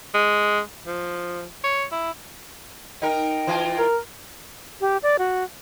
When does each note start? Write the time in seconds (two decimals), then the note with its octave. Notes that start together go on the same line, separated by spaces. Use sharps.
0.14 G#3
0.86 F3
1.64 C#5
1.92 E4
3.02 D#4 A#4 G5
3.47 E3 F4
3.79 A#4
4.81 G4
5.03 D5
5.19 F#4